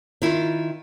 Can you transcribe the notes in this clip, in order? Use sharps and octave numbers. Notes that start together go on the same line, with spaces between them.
D#3 E4 F4